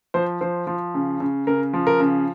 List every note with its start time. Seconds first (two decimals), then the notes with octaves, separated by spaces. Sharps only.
0.14 F3 C5
0.41 F3 C5
0.67 F3
0.94 C#3
1.20 C#3
1.47 C#3 A#4
1.73 F3
1.87 A#4
2.00 C#3